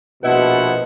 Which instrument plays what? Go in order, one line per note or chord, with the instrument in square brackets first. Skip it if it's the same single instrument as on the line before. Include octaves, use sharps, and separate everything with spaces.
[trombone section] A#1 B2 [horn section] F3 E4 F#5 [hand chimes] B4 D#5